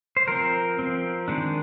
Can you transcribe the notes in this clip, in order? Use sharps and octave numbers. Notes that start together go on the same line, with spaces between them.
C5
F3 C4 A#4
F3 C4
D#3 G#3 D4